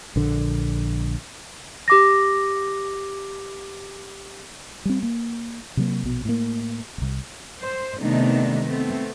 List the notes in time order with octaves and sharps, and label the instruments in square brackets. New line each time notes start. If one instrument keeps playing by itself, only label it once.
[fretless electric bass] A#1 D3
[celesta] G4 D6 A#6
[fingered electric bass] G3 C4
A#3
C3 F#3 A#3
A#1 B2
A2 A#3
D#1 C2
[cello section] C5
C3 D#3 A3 B3 D4 D#4
A3 B3 C4